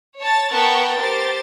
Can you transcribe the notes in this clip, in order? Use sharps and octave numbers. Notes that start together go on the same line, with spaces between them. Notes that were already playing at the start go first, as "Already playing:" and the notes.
C#5 A5 A6
B3 A#4 F#5 G5 A5 C#6
G4 A#4 C5 A6